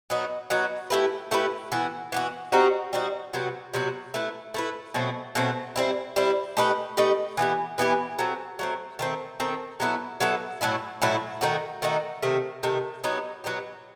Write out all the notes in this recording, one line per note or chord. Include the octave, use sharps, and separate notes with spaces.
F#3 B3 D#4 F#4
F#3 B3 D#4 F#4
A3 E4 G4 B4
A3 E4 G4 B4
E3 B3 F#4
E3 B3 F#4
G3 C4 D#4 F#4
G3 C4 D#4 F#4
C3 F#3 B3 F#4
C3 F#3 B3 F#4
A3 E4 B4
A3 E4 B4
B2 F#3 A3 C4
B2 F#3 A3 C4
G3 C4 E4
G3 C4 E4
A3 D#4 G4 B4
A3 D#4 G4 B4
E3 B3 E4 G4
E3 B3 E4 G4
F#3 A3 C4
F#3 A3 C4
D#3 A3 C4
D#3 A3 C4
F#3 B3 E4 A4
F#3 B3 E4 A4
A2 F#3 A3 E4
A2 F#3 A3 E4
D#3 A3 D#4 F#4
D#3 A3 D#4 F#4
C3 D#3 A3
C3 D#3 A3
F#3 B3 D#4 G4
F#3 B3 D#4 G4